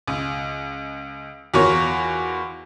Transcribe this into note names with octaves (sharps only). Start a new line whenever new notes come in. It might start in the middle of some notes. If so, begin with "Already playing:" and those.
C#2
E2 F4 F#4 A#4 C#5